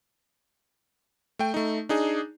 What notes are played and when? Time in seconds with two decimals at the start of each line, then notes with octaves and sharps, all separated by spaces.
1.39 A3 G5
1.54 A3 D#4
1.89 D4 D#4 G#4